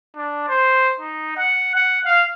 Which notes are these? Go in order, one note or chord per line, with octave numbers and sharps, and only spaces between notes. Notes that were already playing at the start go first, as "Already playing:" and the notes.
D4
C5
D#4
F#5
F#5
F5